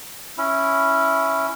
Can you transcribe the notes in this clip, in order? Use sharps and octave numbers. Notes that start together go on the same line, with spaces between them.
C#4 E4